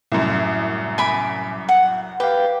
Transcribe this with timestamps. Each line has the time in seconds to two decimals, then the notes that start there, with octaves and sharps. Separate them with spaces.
0.12 C2 F#2 A2
0.98 G#5 B5 D6
1.69 F#5
2.20 G4 B4 F5